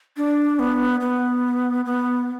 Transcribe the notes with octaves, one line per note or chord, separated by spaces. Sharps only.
D4
B3
B3
B3